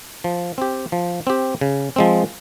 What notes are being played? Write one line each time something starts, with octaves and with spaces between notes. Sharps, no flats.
F3
C4 G4
F3
C4 G4
C#3
F3 G#3 C4